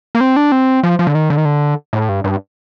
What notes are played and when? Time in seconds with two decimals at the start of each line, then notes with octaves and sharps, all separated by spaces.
0.15 A#3
0.21 C4
0.36 D4
0.52 C4
0.83 F3
0.99 F3
1.07 D3
1.15 D#3
1.30 D3
1.37 D#3
1.45 D3
1.93 A2
2.09 G2
2.24 G2